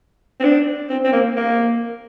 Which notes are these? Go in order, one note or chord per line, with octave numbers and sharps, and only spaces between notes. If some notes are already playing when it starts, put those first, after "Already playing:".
C4
D4
C4
C4
A#3
A#3